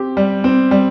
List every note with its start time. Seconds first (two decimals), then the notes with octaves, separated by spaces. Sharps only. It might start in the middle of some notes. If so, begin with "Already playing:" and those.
Already playing: C4 G4
0.17 G3
0.44 C4
0.71 G3